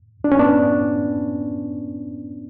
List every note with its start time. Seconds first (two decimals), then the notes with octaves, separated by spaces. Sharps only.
0.24 D4
0.32 C#4
0.39 B3 D4